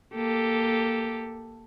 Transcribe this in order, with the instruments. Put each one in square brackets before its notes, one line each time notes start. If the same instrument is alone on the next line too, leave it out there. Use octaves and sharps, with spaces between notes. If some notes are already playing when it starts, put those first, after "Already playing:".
[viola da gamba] A#3 G4 A4